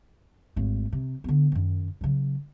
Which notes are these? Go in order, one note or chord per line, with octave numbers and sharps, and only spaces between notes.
G#1 A3
C3
D3 B3
F#2 D#3
C#3 F#3